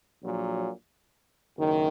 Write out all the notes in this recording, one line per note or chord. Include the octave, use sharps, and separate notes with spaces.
A#1 A#2 F#3
F#1 F#2 D#3